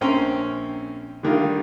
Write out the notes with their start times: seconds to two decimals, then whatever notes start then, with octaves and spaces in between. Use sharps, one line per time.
0.01 A#1 C4 C#4 G5 A#5 C6
1.23 D3 D#3 G3 F4